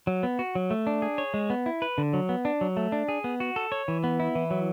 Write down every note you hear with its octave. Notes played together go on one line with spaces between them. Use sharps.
F#3
B3
F#4
F#3
A3
D4
G#4
C#5
G#3
B3
E4
B4
D3
F#3
B3
D4
F#3
A3
D4
G#4
B3
F#4
A4
C#5
E3
B3
E4
E3
F#3